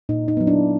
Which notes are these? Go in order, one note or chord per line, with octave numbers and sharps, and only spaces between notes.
A#2 D#4
D#4
F#3 B3
D4 E4